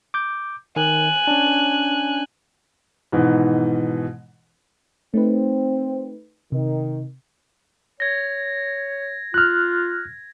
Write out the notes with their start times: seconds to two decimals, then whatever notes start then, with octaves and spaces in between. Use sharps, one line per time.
0.14 D6 G6
0.76 D#3 G#5 F#6
1.27 C#4 D4
3.12 G#2 B2 D#3 E3
5.14 A3 C4 D#4 B4
6.52 C3 D#3
8.00 C#5 G#6 A#6
9.34 F4 F6 F#6